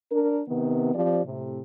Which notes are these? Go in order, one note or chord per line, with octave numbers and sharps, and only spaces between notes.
D4 A#4
C3 D#3 B3
F3 C4 G4 D5
A2 C3